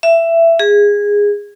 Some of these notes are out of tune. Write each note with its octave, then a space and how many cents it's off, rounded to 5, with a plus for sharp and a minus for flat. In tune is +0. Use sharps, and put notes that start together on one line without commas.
E5 +15
G#4 -15